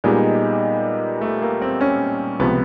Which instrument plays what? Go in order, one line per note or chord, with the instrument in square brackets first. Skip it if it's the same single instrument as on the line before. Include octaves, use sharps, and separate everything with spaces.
[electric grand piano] A#2 G3 B3 D#4 G4 [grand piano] G#3
[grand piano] A3
A#3
C4
C#4
[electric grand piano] C#2 C3 F3 [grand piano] B3